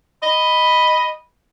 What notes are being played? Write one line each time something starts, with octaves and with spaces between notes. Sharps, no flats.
D#5 B5